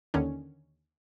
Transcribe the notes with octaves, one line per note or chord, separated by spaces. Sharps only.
D#2 D3 D#3 C#4